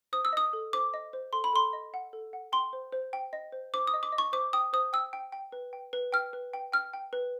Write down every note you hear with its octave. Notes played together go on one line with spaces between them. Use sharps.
C5 D#6
E6
D#5 D#6
A4
C5 D6
D#5
C5
A4 C6
B5
A4 C6
D#5
F#5
A4
F#5
G5 C6
C5
C5
G5
D#5
C5
C5 D6
D#6
D#5
D6
D#5
C#6
C5 D6
G5 D#6
C5 D#6
G5 E6
G5
G5
B4
G5
B4
G5 F6
B4
G5
G5 F6
G5
B4